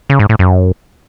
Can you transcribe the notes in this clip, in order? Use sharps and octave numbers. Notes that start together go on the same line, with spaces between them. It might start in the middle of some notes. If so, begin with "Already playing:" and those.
C#3
G#2
A2
F#2